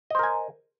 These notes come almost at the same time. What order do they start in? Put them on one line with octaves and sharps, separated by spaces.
D#5 C5 A#4 G#5